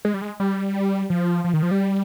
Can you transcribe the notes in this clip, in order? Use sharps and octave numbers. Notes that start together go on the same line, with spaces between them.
G#3
G3
G#3
G3
F3
F3
D#3
F3
G3